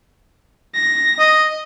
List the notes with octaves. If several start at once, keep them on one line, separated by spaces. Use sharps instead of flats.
A#6
D#5